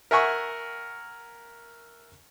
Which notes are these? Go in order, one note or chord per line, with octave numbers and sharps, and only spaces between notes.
A#4 E5 F#5 G#5 C#6